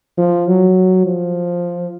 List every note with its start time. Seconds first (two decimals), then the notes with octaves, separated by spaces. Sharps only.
0.18 F3
0.48 F#3
1.06 F3